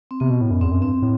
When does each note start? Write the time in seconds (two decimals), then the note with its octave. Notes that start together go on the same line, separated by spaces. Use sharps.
0.11 C4
0.20 C3 B3
0.30 B2
0.41 A2
0.51 F#2
0.61 E2 C4
0.72 F#2
0.81 G2 C4
1.02 A2